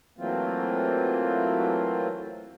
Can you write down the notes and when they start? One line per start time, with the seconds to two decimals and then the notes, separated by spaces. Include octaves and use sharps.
0.18 E3 F#3 A3 A#3 C4 F4